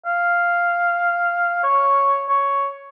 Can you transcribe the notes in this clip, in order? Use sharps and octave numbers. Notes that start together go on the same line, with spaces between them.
F5
C#5
C#5